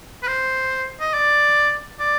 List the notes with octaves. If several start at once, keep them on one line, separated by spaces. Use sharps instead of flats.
B4
C5
D#5
D5
D5